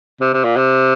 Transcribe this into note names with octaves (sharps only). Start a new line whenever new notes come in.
C3
C3
A#2
C3